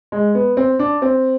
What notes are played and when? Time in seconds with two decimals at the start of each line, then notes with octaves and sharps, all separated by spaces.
0.12 G#3
0.35 B3
0.57 C4
0.79 D4
1.02 C4